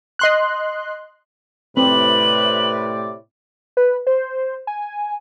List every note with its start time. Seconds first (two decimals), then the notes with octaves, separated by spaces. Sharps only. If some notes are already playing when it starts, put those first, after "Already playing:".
0.19 D#5 C6 F#6
1.77 A2 C3 C4 B4 D5 F#7
3.77 B4
4.07 C5
4.67 G#5